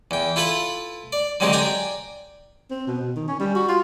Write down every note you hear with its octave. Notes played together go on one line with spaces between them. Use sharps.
E2 G5
E4 F4 A4 B4 A5 B5
D5
D3 D#3 F#3 G#3 C4 G4
D5 G5 G#5 A#5 D6
C4
B2
B2
D#3
C#4
G3
F#4
F4